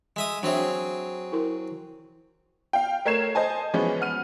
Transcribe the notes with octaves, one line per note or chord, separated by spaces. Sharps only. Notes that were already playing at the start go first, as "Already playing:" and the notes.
G#3 E5 D#6
F#3 C4 D4 G#4 C#5 E5
E4 A#4 C6
F5 G5
A3 A#4 C#5 G#6 C7 E7
C5 D#5 G#5 A5
E3 F3 G#3 B3 C#4
F#5 F6 D#7